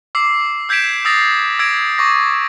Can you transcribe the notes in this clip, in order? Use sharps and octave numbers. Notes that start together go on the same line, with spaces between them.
D6 E6 C7
E6 G6 G#6 B6 D7 E7
D#6 E6 A6 A#6 C7
E6 G#6 A#6 D7
C#6 D6 A#6